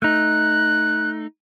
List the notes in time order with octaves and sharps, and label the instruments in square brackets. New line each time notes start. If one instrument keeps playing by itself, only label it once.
[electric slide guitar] A3 D#4 [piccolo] F#6